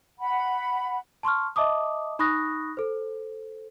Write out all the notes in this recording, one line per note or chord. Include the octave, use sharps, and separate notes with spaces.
F#5 B5
A5 C6 C#6 F6
D#5 E5 A5 D6 D#6
D#4 B5 C#6 D#6 F#6 A#6
A4 C5